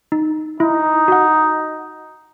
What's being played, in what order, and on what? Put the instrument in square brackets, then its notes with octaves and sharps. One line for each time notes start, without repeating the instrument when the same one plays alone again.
[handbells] D#4
[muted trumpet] D#4 [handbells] E4
[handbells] F#4 F#5